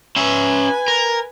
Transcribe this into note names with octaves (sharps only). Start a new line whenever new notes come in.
C#4 B4 E5 G#5
A#4